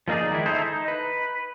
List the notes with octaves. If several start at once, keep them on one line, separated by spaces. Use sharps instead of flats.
F3 A#3 D#4 G#4 D5
D#3 G#3 E4
D#4 E4 A4 C5
D#4
B4